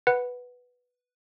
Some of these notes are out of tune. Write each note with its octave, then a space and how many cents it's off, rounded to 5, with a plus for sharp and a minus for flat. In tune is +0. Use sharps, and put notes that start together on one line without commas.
B4 +0 F#5 +0